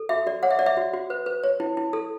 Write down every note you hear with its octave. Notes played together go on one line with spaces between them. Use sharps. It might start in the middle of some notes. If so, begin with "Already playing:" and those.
Already playing: A4
F#4 E5
F#4 D5
C#5 F#5
E5
C#5 D5
E5
F#4
F#4
B4
B4
C#5
E4
E4
A4